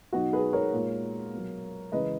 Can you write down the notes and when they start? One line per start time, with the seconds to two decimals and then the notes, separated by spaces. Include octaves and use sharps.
0.13 B2 F#3 D#4 F#4
0.33 G#4 B4
0.53 A#4 C#5
0.73 A#2 G#3
1.33 B2 F#3
1.92 C#3 E3 G#3 B4 D#5